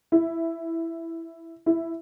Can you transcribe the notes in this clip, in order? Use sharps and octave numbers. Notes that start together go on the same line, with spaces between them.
E4
E4